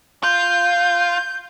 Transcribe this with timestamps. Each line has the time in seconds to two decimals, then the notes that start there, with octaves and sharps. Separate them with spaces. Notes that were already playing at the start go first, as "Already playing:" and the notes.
0.23 F4 G6